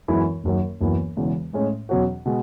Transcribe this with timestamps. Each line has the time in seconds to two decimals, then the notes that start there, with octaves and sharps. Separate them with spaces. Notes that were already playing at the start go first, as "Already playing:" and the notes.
0.08 F#2 E3 G#3 B3 E4
0.44 F#1 F#2 D#3 F#3
0.81 F#1 F#2 E3 B3
1.17 E1 E2 C#3 E3
1.53 A2 G#3 C#4
1.89 E2 B2 F#3 C#4 F#4
2.26 B2 G#3